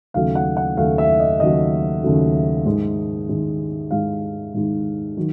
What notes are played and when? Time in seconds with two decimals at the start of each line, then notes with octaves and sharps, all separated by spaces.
0.14 D#2 C#3 F#3 A3 F5
0.36 F#5
0.57 F#5
0.77 D#2 C#3 F#3 A3 F5
0.98 E5
1.20 D#5
1.40 D#2 C#3 F#3 A3 D#5
2.03 D#2 C#3 F#3 A3
2.65 G#2 D#3 G#3
3.29 G#2 D#3 G#3
3.91 G#2 D#3 G#3 F5
4.54 G#2 D#3 G#3
5.17 D#3 F#3